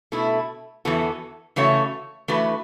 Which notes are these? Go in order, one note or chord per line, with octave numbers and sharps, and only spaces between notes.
B2 A3 E4
E2 E3 B3 F#4 A4
C#3 E3 A3 F#4 C#5
E3 A3 F#4 B4